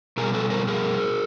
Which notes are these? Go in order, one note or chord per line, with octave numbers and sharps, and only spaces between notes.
B2 G3 G#4 A#4
A4 B4
A#4 C5
G#4 A#4